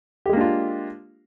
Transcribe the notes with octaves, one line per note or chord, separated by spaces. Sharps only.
G#3 A#3 D4 F4 G4